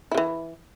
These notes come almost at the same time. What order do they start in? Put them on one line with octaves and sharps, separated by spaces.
E4 C#3 E3